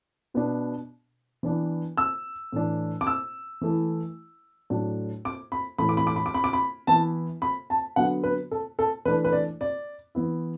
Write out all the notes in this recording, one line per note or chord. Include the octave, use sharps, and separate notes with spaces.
B2 B3 D4
E3 B3 D4
E6
A2 E3 D4
D6
E6
E3 A3 E4
A2 F#3 D4
D6
B5
A2 E3 A3 B5
D6
B5
D6
B5
D6
B5
D6
B5
E3 B3 E4 A5
B5
A5
D3 F#3 B3 F#5
B4
A4
A4
E3 A3 D4 B4
B4
D5
D5
E3 B3 E4